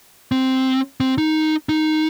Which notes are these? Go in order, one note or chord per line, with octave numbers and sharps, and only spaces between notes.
C4
C4
D#4
D#4